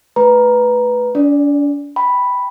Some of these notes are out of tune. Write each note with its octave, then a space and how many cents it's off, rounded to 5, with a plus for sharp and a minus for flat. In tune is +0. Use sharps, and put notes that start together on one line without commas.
A3 -10 B4 +0 A#5 +10
D4 -40 D5 +0
G5 +10 B5 +0